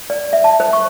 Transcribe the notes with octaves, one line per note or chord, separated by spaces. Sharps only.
D5
E5
A5
C5
C#6